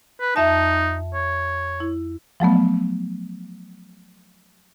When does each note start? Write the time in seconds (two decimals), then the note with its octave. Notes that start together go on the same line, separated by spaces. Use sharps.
0.20 B4
0.36 F2 D#4 E5 A5
1.14 C#5
1.80 E4
2.40 F3 F#3 A3 B3